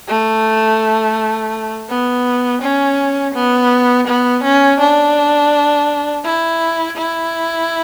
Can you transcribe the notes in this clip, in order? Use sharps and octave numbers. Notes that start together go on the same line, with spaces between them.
A3
B3
C#4
B3
B3
C#4
D4
E4
E4